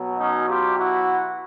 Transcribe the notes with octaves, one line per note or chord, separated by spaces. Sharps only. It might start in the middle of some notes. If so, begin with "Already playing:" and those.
Already playing: B2 F#3
C#4 D#4
F4 G4
E4 F#4